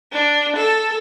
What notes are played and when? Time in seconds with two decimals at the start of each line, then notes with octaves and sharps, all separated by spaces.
0.12 D4
0.56 A4